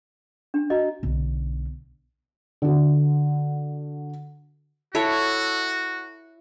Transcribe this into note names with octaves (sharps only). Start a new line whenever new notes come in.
D4
F#4 D#5 A#5
B1 D3
D3 F#4
E4 F#4 A4 C#5